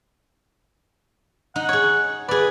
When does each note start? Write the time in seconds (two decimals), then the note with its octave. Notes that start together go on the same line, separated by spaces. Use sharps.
1.56 D#4 F#5
1.69 G#4 C#5
2.29 G#4 B4 D5